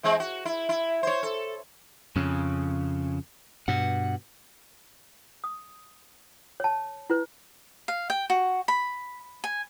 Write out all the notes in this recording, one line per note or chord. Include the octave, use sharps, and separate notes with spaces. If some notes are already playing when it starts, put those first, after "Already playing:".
E3 G#3 C4
F#4
E4
E4
C5 C#5
A4
F2 C#3
G2 B2 F#5
D#6
C#5 A5
E4 B4
F5
G5
F#4
B5
G#5